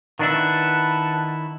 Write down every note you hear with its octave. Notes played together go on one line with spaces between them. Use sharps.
D#3 D4 E4 B4 F#5 A5